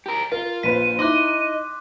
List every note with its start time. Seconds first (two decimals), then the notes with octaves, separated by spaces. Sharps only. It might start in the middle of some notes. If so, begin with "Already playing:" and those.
0.06 G4 A#4
0.32 F4 A#4
0.63 A#1 B4 C5 B6 D#7
0.99 D#4 E4 D#5 C6 D6 F#6